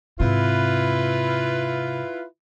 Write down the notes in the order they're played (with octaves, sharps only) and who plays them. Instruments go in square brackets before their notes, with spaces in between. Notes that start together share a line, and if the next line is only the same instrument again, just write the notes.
[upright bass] G#2 C3 [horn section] E4 F4 B4